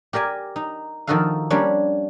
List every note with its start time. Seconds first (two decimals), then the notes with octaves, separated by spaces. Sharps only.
0.13 G4 A#4 D5 G#5
0.56 D#4
1.07 D#3 F3 D#4 F#4 A4 F5
1.50 G3 A#3 C#4 D4 C#5